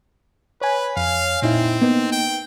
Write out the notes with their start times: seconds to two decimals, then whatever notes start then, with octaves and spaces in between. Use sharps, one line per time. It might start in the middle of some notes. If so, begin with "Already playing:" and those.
0.61 B4 C#5 G#5
0.97 F2 F5
1.42 A#2 C4 D#4 E4
1.82 A#3 B3 D#4
2.12 G5